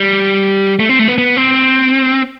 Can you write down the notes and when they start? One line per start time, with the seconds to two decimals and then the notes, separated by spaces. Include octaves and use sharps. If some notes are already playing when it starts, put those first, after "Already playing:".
Already playing: G3
0.80 A3
0.89 C4
0.99 A3
1.08 B3
1.18 B3
1.37 C4